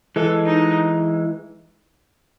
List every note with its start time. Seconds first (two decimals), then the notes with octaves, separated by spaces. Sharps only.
0.16 E3 G#3 A4
0.46 D#4